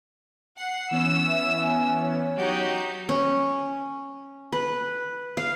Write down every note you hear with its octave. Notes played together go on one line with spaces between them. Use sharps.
F#5 C7
E3 B3 C#4 E6
E5
G#5
C#5
F#3 D#4 F#4 G4 G6
C#4
B4
F5